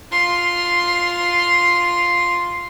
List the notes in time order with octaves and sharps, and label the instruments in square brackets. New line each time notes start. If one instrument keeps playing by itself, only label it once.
[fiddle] F4 C6